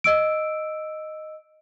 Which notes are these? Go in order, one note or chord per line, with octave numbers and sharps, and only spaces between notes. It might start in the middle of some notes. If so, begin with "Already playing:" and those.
D#5 E6 D7